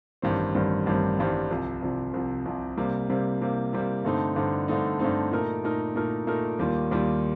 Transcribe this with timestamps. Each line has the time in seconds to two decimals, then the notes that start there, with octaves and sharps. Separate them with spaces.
0.22 A1 G2 D#3 G3 C4
0.54 A1 G2 D#3 G3 C4
0.86 A1 G2 D#3 G3 C4
1.19 A1 G2 D#3 G3 C4
1.50 C2 C3 F3
1.82 C2 C3 F3
2.14 C2 C3 F3
2.45 C2 C3 F3
2.77 C3 G3 A#3
3.10 C3 G3 A#3
3.41 C3 G3 A#3
3.73 C3 G3 A#3
4.04 G2 D3 A3 C4 D#4
4.36 G2 D3 A3 C4 D#4
4.68 G2 D3 A3 C4 D#4
4.99 G2 D3 A3 C4 D#4
5.32 A#2 A3 D#4 A#4
5.64 A#2 A3 D#4 A#4
5.95 A#2 A3 D#4 A#4
6.27 A#2 A3 D#4 A#4
6.59 D#2 D#3 G3 A#3 F4
6.91 D#2 D#3 G3 A#3 F4